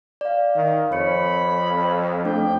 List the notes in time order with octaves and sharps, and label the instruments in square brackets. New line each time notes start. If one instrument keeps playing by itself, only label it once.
[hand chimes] D5 F5
[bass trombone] D#3 [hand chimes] F5
[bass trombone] F2 [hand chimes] C#5 C#7 [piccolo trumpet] B5
[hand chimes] A3 D4 A4 [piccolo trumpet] G5